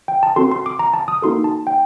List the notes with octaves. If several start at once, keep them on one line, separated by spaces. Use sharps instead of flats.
G5
A5
C4 F#4 A4 C6
C6
D6
A#5
A5
D#6
A#3 D#4 F#4 A4 C6
A5
G5